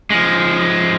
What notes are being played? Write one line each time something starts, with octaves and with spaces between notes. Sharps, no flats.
F3 G#3